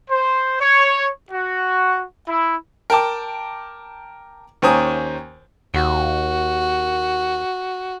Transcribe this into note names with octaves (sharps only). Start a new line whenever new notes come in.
C5
C#5
F#4
E4
A#4 G5 A5 D6
D#2 C#4 C5 G#5 A#5 D#6
D#2 F#4